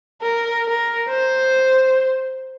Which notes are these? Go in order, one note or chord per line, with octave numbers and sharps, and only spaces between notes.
A#4
A#4
C5